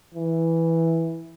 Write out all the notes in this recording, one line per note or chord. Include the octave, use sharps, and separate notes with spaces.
E3